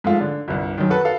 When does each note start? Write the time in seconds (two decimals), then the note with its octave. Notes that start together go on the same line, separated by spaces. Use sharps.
0.04 G#2 F3 A3 F4
0.20 D3
0.48 G1 C2
0.78 F#2 D#3
0.90 F#4 A4 B4
1.05 A4 F5